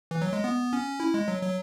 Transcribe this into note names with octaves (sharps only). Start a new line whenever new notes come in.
E3
F#3
G#3
B3
C#4
E4
G#3
F#3
F#3